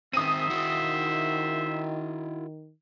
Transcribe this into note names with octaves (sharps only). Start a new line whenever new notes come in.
D#3 C4 C5 E5 D#6 D#7
D#3 E4 F#4